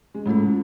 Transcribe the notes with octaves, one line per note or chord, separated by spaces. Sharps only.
G#3
A2 G#3 A3 C#4 F4 A4